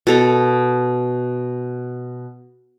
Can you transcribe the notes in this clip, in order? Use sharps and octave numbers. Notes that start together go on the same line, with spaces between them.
B2 A4 A#5